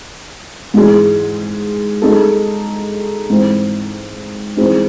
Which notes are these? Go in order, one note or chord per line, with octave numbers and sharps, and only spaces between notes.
G#2 E3 G#3
G#3 D#4 A4
G#2 E3 C4
E3 G#3 C4 D#4